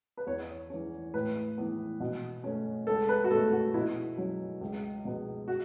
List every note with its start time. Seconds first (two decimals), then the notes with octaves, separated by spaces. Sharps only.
0.17 B4
0.26 E2 C#5
0.70 E3 C#4
1.14 A2 B4
1.58 E3 B3
2.00 B2
2.44 A3 C#4
2.87 C#2 A4
3.09 B4
3.24 F#4
3.31 B2 A3 C#4 A4
3.52 F#4
3.74 B2 E4
4.18 F#3 C#4
4.61 C#2
5.05 B2 B3
5.48 F#4